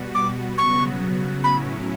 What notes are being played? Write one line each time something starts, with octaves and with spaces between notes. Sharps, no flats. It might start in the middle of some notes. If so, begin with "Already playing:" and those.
Already playing: B2 G3 B3 F#4
D6
C#3 F#3 B3 F#4 C#6
A2 F#3 C#4 E4 B5